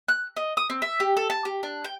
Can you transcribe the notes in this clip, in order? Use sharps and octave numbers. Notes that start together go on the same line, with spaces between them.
F#6
D#5
D#6
C4
E5
G4
A4
A5
G4
D4
G5